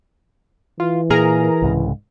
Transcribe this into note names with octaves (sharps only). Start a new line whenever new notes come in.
E3 F4
A#2 G#4 A#4 A#5
C2 G#2 C#3